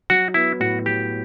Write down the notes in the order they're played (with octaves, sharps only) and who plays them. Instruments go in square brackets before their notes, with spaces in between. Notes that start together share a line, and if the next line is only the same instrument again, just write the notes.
[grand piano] F#3 [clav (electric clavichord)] F#4
[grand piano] B3 [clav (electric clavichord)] E4
[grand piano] A2 [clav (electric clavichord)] F#4
[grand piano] F#3 [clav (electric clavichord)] G4